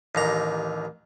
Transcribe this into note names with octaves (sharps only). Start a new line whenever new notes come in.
A1 D#2 A#5